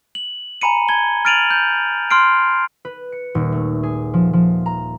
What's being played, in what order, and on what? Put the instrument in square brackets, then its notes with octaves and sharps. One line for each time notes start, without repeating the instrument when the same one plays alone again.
[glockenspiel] F#7
G#5 A#5 B5 C#7 D#7
A5 G#6 G7
F6 A6 D7 D#7 F7 F#7
G6
C6 F6 C7 D7
[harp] B4
C#7
D#1
A3
G#4
F3
F3
A#5